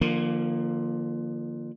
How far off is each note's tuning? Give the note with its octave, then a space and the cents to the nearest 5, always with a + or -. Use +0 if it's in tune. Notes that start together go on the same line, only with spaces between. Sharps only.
D3 +35 F3 -10 A#3 +0